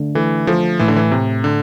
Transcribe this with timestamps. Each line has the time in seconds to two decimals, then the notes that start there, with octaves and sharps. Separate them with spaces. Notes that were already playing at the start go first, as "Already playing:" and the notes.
Already playing: D3 A3
0.15 E3 A3
0.47 F3 A3
0.79 A2 E3
0.88 D3
0.96 E3
1.11 A2 C3
1.44 D3